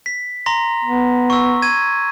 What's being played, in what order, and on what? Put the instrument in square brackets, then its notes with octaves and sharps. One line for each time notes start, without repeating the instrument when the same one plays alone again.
[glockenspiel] B6
A#5 C6 A#6
[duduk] B3
[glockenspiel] C#6 E6
G#6 D#7